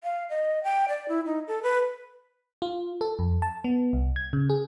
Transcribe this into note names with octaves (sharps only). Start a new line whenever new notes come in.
F5
D#5
G5
D5
E4
D#4
A4
B4
F4
A4
F2
A5
B3
C2
G#6
C#3
G#4